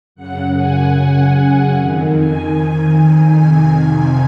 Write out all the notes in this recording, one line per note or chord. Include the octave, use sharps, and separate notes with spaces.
F#2 C#3 F#5
G#5
G#5
F#5
F2 D#3
G#5
G#5
F2 C3 D#3 G#5